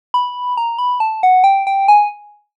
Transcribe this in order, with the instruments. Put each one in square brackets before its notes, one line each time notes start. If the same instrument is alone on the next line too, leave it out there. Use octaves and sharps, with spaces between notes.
[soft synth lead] B5
A#5
B5
A5
F#5
G5
G5
G#5